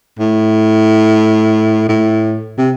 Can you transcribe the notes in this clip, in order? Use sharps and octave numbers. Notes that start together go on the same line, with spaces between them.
A2
A2
C3